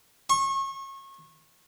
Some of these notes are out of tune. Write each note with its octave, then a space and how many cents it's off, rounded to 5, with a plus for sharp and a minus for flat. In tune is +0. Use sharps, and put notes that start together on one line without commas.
C#6 -30